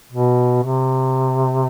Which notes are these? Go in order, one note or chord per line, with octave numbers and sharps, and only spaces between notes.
B2
C3